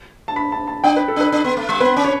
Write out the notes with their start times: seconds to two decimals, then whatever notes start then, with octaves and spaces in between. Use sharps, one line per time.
0.28 A5
0.36 B5
0.52 A5
0.68 A5
0.84 D4 G5
0.96 B4
1.08 A4
1.16 D4 B4
1.32 D4
1.44 B3
1.57 A3
1.69 G3
1.80 B3 B4
1.96 C#4
2.05 C#5